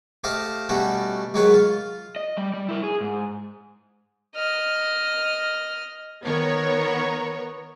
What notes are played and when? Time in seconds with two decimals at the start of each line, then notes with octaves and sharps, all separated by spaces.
0.24 A3 G4 C5 D#5 F5
0.69 B2 G3 A3 C#4 F#4
1.34 G#2 D#3 F#3 G#3 B4 C#5
1.54 F4
2.16 D#5
2.37 G3
2.54 G3
2.69 E4 A#4
2.83 G#4
3.01 G#2
4.36 D#5 F6
6.24 D#3 B3 A#4 C#5